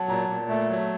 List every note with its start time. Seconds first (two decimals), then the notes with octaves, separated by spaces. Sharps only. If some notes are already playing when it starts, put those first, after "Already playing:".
Already playing: F#3 F#5 A5
0.08 A#2 A#5
0.29 A#2
0.49 A3
0.70 F#3